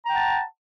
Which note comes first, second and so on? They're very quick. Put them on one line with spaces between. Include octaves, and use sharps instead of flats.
A#5 G5 F#5 A5